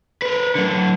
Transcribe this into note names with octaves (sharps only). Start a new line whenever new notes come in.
A#4 B4
D3 F#3